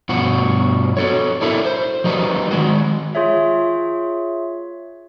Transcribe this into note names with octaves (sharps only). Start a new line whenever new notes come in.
G2 B2 F3 F#4
F#4 A4 C#5
D4 E4 A4 A#4 E5
C5
F3 G3 D#4 F#4 A#4 B4
D#3 G#3 F#4
F4 G#4 C#5 E5